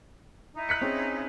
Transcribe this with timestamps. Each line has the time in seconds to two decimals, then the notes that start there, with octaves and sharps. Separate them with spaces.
0.54 D#4 E4
0.69 F#6 B6 C#7
0.81 C4 C#4 G#4